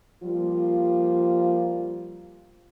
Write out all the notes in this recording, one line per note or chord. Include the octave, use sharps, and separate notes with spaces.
F3 G3 A#3 F4